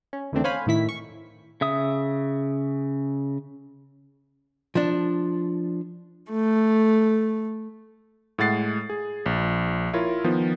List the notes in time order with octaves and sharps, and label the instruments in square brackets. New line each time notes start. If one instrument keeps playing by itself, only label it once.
[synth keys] C#4
E2 D3 D#3 A3 C4 D4
C5 C#5 F5 G#5 B5
A2 D#3 E4 B6
C#6
[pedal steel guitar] C#3 E5 D#6
[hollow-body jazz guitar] F3 D4
[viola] A3
[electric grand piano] A2 G#3 F#5 A6 C7
G#4
A#1
E4 F4 A#4 C#5
D#3 F3 B3